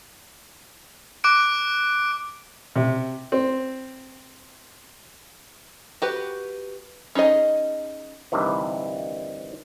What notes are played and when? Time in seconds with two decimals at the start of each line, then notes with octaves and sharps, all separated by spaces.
1.24 D6 F#6 D7
2.76 C3
3.32 C4
6.02 F#4 G4 B4
7.15 C#4 D#4 G#4 D#5
8.32 D2 G2 C3 D#3 E3